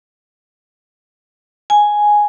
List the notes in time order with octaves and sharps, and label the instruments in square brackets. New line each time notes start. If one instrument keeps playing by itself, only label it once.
[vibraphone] G#5